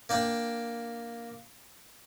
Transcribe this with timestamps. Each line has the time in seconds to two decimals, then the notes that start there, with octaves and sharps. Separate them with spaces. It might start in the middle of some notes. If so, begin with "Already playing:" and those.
0.09 A#3 D4 G5